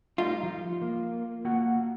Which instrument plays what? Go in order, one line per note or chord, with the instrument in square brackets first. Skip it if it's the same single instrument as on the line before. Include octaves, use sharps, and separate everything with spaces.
[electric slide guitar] G3 A3 D#4 [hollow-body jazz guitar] F4
[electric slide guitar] F3
A#3
A#3 F#4 F#5